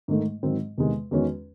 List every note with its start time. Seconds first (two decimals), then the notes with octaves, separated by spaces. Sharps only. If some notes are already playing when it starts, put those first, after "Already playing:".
0.08 G#2 D#3 A3 D#4
0.43 G#2 D#3 F#3 C4
0.78 E2 C3 D#3 G#3
1.11 E2 D#3 G#3 C#4 F#4